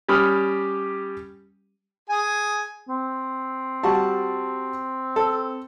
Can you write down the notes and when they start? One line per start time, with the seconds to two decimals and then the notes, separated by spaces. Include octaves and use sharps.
0.08 G3 C#4 G4 B5 D#6 F6
2.09 G#4 G#5
2.89 C4
3.83 G3 F#4 A5
5.16 A4